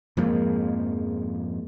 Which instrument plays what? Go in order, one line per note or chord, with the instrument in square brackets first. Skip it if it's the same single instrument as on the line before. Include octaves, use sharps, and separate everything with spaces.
[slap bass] F2 G#2 F3 [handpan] G#3 A#3